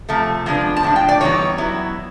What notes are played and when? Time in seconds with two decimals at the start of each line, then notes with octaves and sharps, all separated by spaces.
0.09 C3 F3 A3
0.46 F3 G#3 B3 D4
0.77 A5
0.83 A2 F3 D4
0.96 G5
1.09 D5
1.21 E3 G3 B3 D#4 C#5
1.58 F#3 B3 E4